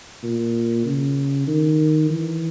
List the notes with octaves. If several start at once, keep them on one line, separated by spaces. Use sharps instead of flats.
A#2
C#3
D#3
E3